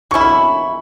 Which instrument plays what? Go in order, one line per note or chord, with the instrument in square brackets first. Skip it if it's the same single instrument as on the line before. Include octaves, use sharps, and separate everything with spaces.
[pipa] F#3 C#4 E4 [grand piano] C#6
[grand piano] B5